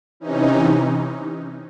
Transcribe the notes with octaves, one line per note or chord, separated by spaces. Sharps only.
C3 E3 C#4 D#4